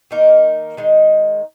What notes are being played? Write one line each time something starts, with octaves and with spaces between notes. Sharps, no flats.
D#3 A#3 D#4 A#4
D#3 G#3 D#4